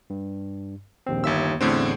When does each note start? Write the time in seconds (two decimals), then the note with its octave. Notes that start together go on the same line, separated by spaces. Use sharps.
0.10 G2
1.06 A#1 D#2 C4
1.24 G1 D#2 E5 E6
1.61 A1 E2 A2 D3 C4